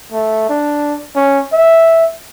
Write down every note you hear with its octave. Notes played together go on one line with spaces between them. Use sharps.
A3
D4
C#4
E5